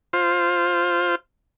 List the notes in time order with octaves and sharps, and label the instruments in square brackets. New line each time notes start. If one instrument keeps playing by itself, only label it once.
[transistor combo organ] F4 C5